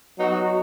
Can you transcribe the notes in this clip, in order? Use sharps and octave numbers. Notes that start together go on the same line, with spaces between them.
F#3 B3 D#4 F#4